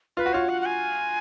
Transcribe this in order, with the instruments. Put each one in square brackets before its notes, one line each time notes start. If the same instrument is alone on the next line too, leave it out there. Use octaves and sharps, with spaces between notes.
[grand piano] F4 [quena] B4
[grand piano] F#4
[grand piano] F4 [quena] C#5
[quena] F#5
F#5
G#5